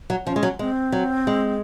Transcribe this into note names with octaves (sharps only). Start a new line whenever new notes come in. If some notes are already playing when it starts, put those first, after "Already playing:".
F#3
F3 C#4
G#3
F#3
G#3 C4
F#3
G#3